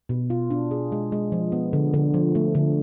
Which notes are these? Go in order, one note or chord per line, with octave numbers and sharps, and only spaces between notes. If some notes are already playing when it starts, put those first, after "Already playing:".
B2
F4
D4
G#4
G#3
G#3
F3
B3
D3
D3
F3
A3
D3